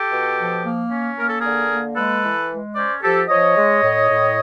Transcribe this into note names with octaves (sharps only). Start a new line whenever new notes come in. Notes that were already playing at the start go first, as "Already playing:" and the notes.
Already playing: G4 A4
B2
F3
A#3
C#4
A#3 A#4
A4
D3 G#4 A#4
A#3
G#3 A4 B4
E3
G#3
C#4 C5 D5
F3 G4 A4
F3 C#5 D#5
G#3
A2
A2